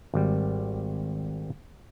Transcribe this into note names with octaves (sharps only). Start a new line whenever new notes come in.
G#1 G3